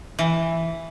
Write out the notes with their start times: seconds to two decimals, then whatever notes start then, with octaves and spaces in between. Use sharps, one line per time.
0.19 E3